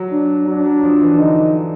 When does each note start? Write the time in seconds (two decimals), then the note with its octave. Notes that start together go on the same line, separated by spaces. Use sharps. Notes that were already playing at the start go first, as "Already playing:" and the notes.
Already playing: F#3
0.12 D4
0.47 F#3 D4
0.65 F#3
0.83 F3
1.01 E3
1.19 D3 D#4